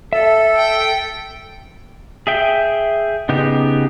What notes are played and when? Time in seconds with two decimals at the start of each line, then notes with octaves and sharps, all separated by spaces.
0.13 A4 E5
0.58 G5
2.27 G#4 E5 G5
3.29 C#3 B3 D#4 G4